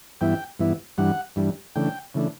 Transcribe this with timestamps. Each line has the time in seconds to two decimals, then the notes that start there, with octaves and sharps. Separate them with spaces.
0.21 G2 E3 B3 E4 G5
0.59 G2 E3 B3 E4
0.98 G2 E3 G3 D4 F#5
1.36 G2 E3 G3 D4
1.76 C#3 E3 A3 D4 G5
2.14 C#3 E3 A3 D4